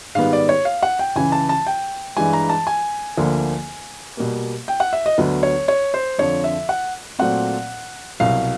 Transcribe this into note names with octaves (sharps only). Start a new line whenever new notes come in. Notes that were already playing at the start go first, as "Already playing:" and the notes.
G#2 D#3 G3 B3 F5
D5
C#5
F5
F#5
G5
C#2 C#3 E3 G#5
A5
A5
G5
G2 E3 G#3 G#5
A#5
A5
G#5
D2 D3 F3 A#3
B2 G3 A#3
G5
F#5
E5
D#5
D2 D3 F#3 B3
C#5
C#5
C5
F2 D3 F3 C#5
E5
F#5
A#2 F#3 A3 C4 F#5
C2 B2 F#3 F5